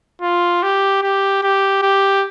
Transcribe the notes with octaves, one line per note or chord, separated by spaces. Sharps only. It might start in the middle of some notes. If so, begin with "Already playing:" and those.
F4
G4
G4
G4
G4